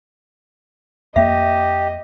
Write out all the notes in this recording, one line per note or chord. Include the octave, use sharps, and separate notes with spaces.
F2 A#3 G4 D#5 E5